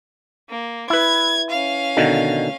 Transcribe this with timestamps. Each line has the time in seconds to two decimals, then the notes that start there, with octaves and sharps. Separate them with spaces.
0.50 A#3
0.90 E4 B4 G#6
1.50 C#4 F5
1.97 B2 D3 D#3